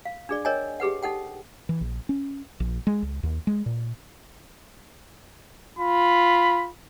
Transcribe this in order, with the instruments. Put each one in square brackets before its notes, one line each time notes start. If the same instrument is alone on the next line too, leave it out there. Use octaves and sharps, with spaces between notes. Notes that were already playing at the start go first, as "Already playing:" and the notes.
[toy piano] F5
D4 G#4 D5
A#4 C#5 D#5 G5 G#5
G4 G#4 B4 F#5
D#4 A4 F#5 G5
[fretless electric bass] E3
A#1
C#4
A#1
G#3
C#2
D#2
G#3
A#2
[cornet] F4 [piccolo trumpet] B5